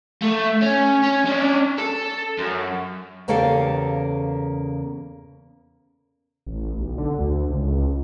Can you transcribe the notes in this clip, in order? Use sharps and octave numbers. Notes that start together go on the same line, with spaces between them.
A3
C#4
C#4
C#4 D4
A4
F#2
E2 C#3 A#3 G4 A4 F5
A1
B1
D3
D2
C#2